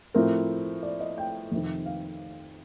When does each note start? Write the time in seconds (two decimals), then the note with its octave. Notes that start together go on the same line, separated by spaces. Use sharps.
0.14 A2 F3 C4 A#4
0.83 D5
1.00 D#5
1.18 G5
1.52 F2 C3 D#3
1.86 F5